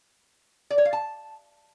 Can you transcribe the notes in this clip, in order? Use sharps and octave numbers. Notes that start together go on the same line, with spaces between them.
D5
C#5
F5
A5